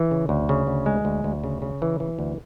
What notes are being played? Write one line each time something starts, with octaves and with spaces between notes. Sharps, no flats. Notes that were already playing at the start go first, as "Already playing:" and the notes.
Already playing: E3
C#3
D2
C#3
D2
G#3
D2
D2
C#3
C#3
E3
E3
D2